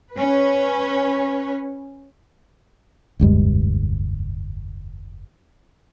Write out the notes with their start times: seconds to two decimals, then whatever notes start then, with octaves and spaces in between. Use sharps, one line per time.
0.12 C#4 B4
3.19 F1 D2 G2 G#3